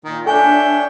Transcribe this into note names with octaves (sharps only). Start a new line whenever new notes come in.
A#2 D#3
D4 A4 C#5 E5 G5 G#5